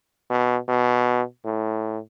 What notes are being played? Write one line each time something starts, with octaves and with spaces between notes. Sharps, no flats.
B2
B2
A2